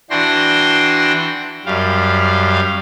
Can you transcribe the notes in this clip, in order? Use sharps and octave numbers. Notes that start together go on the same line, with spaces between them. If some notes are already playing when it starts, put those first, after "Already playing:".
E3 D4 F#4 G5 C6 A#6
F#2 G3 F5